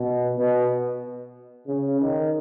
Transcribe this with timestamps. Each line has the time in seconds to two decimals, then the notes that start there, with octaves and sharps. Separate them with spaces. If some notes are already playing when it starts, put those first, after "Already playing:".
Already playing: B2
0.37 B2
1.67 C#3
2.01 D#3